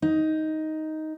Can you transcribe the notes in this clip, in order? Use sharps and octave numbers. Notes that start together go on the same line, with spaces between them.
D#4